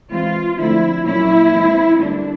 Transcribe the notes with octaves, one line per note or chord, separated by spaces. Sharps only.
E3 G#3 C4 F4
D3 F3 A3 C4 E4
A#2 F#3 A#3 C#4 E4
E3 G#3 C4
D3 G3 A#3 D4